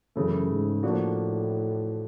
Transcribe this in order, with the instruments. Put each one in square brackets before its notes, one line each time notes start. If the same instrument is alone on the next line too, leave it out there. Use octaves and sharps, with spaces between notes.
[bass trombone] F#2 [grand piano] C#3 E3 A3
[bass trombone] G#2
[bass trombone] A2 [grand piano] F3 A#3 D4 F#4